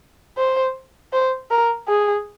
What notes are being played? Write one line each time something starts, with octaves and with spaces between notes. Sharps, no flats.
C5
C5
A#4
G#4